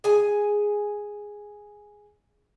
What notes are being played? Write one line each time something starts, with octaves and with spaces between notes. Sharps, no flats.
G#4 G#5